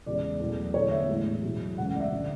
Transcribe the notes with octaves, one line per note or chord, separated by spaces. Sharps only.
E2 C#3 E3 G#3 D5
E2 B2 F#3 A3
E2 D3 A3 C#5
E5
A2 E3 G#3
E2 B2 F#3
C#2 C#3 E3 A3 F#5
F#5
D5
E5
D3 G#3